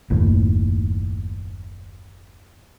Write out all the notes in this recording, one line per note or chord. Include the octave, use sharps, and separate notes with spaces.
F#1 D#2 A2